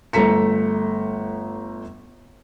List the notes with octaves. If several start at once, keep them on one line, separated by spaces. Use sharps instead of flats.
G1 A3 A#5 B6 C#7